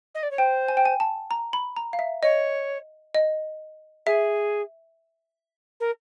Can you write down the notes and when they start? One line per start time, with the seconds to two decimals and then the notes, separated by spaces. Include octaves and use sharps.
0.15 D#5
0.23 D5
0.31 C#5
0.38 C5 G5
0.68 G#5
0.77 G5
0.85 G#5
1.00 A5
1.31 A#5
1.53 B5
1.77 A#5
1.93 F5
1.99 E5
2.23 C#5 D#5
3.15 D#5
4.06 G#4 E5
5.80 A#4